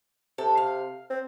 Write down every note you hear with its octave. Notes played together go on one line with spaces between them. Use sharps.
C3 A4
F5
C4